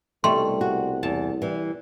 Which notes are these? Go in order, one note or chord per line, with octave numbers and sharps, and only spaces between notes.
C2 B2 G3 A3 C6
F#4
E2 A5
E3 G3